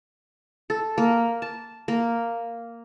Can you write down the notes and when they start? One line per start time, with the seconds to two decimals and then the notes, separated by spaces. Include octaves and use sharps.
0.70 A4
0.98 A#3
1.42 A5
1.88 A#3